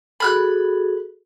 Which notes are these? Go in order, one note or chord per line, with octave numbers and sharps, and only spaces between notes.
F#4 G#4 A4 B5 F6 F#6